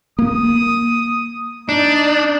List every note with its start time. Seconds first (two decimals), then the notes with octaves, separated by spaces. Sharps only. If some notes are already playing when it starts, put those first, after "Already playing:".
0.19 A#3 D#6
1.69 D4 D#4